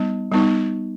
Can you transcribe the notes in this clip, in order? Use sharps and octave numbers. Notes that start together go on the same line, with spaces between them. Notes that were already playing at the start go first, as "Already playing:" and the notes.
Already playing: G3 B3 D#4
G3 B3 D#4